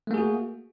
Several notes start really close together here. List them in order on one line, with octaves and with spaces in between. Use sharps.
A3 A#3 G#4 F#4